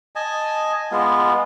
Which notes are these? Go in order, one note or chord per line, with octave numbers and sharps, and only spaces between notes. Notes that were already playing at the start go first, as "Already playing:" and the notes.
D#5 G#5 A5
G#3 B3 F4